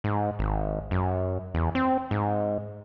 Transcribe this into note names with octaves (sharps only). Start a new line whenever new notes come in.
G#2
G#1
F#2
E2
C4
G#2